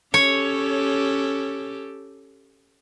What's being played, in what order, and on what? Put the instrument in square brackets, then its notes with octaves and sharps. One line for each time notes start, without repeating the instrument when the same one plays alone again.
[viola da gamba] C#4 G4 A4 [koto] C#5